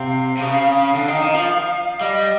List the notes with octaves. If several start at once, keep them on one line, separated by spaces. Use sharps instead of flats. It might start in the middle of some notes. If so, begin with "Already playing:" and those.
Already playing: C3 F5
C3
C#3 F5
D3
D#3
D#3
F3
G3 D#5